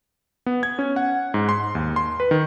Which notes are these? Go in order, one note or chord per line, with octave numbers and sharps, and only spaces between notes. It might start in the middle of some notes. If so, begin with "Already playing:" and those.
B3
G#6
C#4
F#5
G#2
C6
D#2
C6
B4
D#3